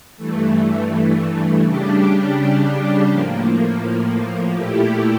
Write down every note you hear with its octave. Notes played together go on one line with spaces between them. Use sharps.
G2 E3 A3
C#3 G3 D4 G4
A2 F3 A#3
A#2 A3 E4 G4